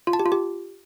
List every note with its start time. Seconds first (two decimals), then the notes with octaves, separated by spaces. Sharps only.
0.07 F4
0.13 A5
0.19 G4
0.26 F4
0.32 G4